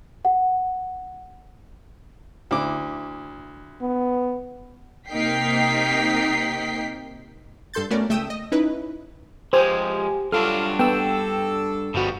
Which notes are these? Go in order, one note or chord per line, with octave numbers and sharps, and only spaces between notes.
F#5
D2 E4 D6
B3
C3 A#3 D#4 G5 B6 C7
G2 A4 C6 G6 A6
A3 B3 C#4 F#4 A#4 D5
C#2 A3 E5 G5 D#6 E6
D#5
C#4 D#4 E4 B4
F3 G#3 G4 C5 G#5
G2 F#3 D4 F4 F#4 A4 F6
B3 A4 G5 E6
G1 B2 F3 G3 F#4